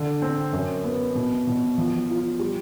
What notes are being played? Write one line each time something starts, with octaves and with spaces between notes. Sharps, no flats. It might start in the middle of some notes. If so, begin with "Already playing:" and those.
Already playing: D3
C4
F#2
B3
B2
B2
F3
F4
G3